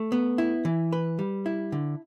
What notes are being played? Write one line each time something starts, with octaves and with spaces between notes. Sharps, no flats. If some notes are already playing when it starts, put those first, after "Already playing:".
Already playing: A3
B3
E4
E3
B4
G3
E4
D3